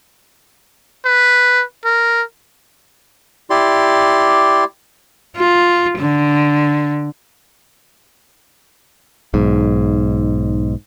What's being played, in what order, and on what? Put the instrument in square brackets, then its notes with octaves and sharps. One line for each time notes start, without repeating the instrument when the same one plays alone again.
[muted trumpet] B4
A#4
[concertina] E4 G4 D5 C6
[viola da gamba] F4
D3
[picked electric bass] B1 G#2